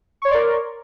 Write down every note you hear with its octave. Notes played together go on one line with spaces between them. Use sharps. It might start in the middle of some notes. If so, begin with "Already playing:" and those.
A#4 C#5 D5 C6 C#6